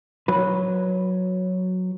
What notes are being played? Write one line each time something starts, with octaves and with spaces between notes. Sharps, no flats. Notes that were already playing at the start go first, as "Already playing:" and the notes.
F#3 B4